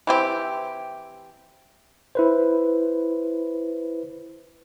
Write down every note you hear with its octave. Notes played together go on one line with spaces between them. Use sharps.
E3 C4 G4
E4 B4 C5